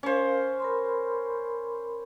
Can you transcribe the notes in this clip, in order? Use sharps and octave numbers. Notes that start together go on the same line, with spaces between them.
C#4 A#4 C5 F5
A#4 B5 C6